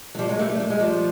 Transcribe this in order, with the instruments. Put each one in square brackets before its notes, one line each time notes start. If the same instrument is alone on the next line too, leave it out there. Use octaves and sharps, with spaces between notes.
[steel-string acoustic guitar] F#3
F3 G3
F#3 G#3
G3 A3
G3 A3
G3
G#3
F3 G3